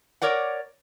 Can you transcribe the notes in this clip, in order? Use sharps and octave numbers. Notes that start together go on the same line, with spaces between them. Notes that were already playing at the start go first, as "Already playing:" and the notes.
A#4 C#5 D5 F#5